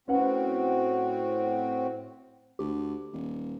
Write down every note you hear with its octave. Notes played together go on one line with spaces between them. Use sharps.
A2 C4 C#4 F#4 B4 F#5
D2 G4
D#1